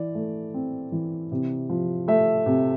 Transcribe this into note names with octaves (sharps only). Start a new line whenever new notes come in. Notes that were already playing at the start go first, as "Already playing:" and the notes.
Already playing: E3 D5
A3
C4
E3
C3
F3
A3 E5
C3